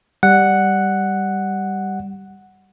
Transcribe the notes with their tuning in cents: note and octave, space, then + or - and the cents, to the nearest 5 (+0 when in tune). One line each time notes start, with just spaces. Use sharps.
G3 +0 F#5 +0